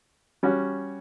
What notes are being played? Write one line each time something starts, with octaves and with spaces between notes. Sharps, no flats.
G3 C#4 F#4